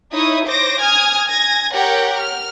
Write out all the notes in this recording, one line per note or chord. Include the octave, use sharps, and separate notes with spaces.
D#4 E4 C#5 D#6
C5 C#5 D6 A#6
G#5 D#6 F6 G#6
G#5 G#6 A#6
G4 A#4 C#5 F#5 G5
F6